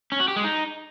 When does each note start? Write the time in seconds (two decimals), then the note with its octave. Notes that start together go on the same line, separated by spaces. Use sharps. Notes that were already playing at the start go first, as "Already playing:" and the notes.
0.12 C#4
0.20 F#4
0.28 G4
0.36 G#3
0.44 D#4